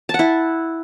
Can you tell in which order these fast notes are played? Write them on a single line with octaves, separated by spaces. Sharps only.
A5 F#5 E4